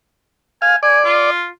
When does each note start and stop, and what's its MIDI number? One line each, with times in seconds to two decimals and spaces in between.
0.62 0.76 77
0.62 0.75 80
0.83 1.30 74
0.83 1.00 80
1.05 1.48 65